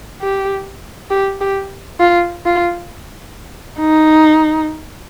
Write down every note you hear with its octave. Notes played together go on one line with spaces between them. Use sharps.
G4
G4
G4
F4
F4
D#4